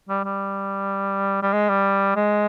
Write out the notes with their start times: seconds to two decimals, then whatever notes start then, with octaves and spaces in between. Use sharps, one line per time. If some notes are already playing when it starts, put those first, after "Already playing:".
0.09 G3
0.24 G3
1.42 G3
1.53 G#3
1.69 G3
2.16 G#3